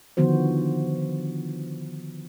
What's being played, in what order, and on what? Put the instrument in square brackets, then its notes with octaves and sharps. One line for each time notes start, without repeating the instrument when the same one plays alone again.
[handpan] D3 D#3 F3 B3 F#4 C5